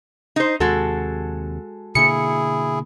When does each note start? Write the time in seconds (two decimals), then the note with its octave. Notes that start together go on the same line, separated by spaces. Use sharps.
0.36 D#4 C5
0.60 D#2 C3 G#3 F#4 A4
1.95 B2 D3 A#3 E4 G#4 C#7